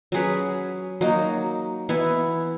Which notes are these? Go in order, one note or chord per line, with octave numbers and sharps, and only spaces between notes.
F#3 C#4 G#4 B4
F#3 A#3 D#4
E3 B3 E4